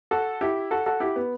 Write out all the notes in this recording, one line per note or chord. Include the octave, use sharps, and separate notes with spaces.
F#4 A4
E4 G4
F#4 A4
F#4 A4
E4 G4
B3